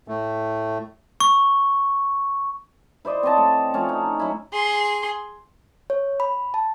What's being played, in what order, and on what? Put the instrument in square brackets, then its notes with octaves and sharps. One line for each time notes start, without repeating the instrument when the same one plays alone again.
[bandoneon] A2 A3
[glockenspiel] C#6
[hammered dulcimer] E4 C5 D5 D#5
C4 C#5 D#5 A5
A3
F3 A3 C#4
D#4
F#3 E4
[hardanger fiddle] G#4 C6
[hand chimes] C#5
B5
A5